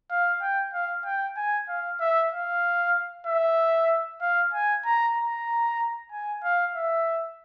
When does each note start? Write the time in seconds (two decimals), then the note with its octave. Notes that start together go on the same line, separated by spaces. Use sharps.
0.10 F5
0.42 G5
0.74 F5
1.05 G5
1.37 G#5
1.69 F5
2.00 E5
2.32 F5
3.27 E5
4.21 F5
4.53 G#5
4.85 A#5
5.17 A#5
6.12 G#5
6.43 F5
6.75 E5